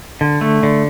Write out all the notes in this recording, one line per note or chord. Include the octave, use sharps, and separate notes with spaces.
D3
A3
D3